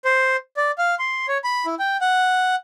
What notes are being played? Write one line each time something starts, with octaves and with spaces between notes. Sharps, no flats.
C5
D5
F5
C6
C#5
B5
E4
G5
F#5